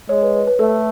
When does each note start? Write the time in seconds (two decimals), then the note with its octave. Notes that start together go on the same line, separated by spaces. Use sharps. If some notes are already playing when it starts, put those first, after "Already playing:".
0.09 G#3 C#5
0.23 B4
0.35 B4
0.47 B4
0.59 A3 A4